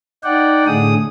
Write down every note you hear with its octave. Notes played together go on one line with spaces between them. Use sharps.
D#4 D5 F#5 G5
A2 D3 G#4 D#6